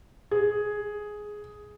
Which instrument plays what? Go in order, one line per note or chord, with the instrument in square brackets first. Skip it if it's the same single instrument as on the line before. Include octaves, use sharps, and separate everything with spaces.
[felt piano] G#4